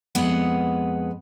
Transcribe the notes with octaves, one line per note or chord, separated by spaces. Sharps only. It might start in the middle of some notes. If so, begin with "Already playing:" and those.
F2 G#3 B3 G#4 B4 F#5